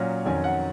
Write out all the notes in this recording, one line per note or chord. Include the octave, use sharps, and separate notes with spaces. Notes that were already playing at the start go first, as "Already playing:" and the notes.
Already playing: A#2 F#3 C#4 F5
F2 D#3 F#3 C#4 G#5
F#5